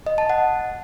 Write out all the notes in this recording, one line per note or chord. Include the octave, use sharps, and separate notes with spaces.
D#5
A5
F#5